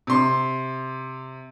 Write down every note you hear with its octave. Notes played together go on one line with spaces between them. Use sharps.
C3 C6